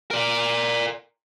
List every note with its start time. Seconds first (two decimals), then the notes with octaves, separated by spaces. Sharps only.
0.11 A#4 D5